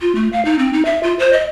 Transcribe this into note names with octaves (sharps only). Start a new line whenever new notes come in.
F4
A3
F5
D#4
C4
D#4
E5
F4
C5
D#5